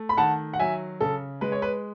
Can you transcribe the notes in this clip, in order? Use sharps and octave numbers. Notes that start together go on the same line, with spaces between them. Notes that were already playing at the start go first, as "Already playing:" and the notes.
Already playing: A3
B5
D#3 F#5 A5
F#5
F#3 E5 G#5
C#3 A4
G#3 B4
C#5
B4